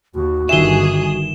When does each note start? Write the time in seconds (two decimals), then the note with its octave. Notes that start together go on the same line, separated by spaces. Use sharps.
0.15 D#2 F#4
0.49 G1 D#3 F4 G#4 E5 E7 G7